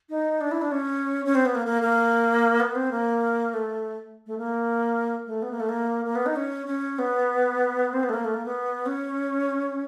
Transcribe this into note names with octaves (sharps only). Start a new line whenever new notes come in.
D#4
D4
E4
D4
C#4
C#4
C4
B3
A#3
A#3
A#3
B3
C4
A#3
A3
A3
A#3
A3
B3
A#3
A3
A#3
A#3
B3
D#4
C#4
C#4
B3
C4
B3
A3
A#3
A3
A#3
B3
C#4